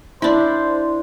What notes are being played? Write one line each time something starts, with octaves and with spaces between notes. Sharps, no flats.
D4 E4 C5